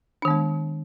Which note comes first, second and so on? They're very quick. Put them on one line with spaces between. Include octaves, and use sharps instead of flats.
D4 D#3 B3 G#3